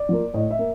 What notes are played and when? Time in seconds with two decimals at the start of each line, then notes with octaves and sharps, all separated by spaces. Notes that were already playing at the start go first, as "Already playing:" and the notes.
Already playing: D5
0.09 F3 A#3
0.34 A2 D#5
0.51 E5
0.59 A#3